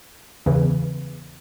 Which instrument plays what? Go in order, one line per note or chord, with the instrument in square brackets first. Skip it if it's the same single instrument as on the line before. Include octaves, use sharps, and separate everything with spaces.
[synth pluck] E2 C#3 E3